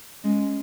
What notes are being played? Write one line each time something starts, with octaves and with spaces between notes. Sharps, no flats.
G#3 C#4